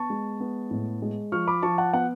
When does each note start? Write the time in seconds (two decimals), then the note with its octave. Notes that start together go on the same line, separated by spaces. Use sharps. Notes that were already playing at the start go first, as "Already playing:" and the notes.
Already playing: B3 A5 C#6
0.10 G#3
0.40 B3
0.71 A2
1.02 G#3
1.32 F3 C#6 F6
1.47 B5 D6
1.63 F3 A5 C#6
1.78 F#5 A5
1.93 B3 F#5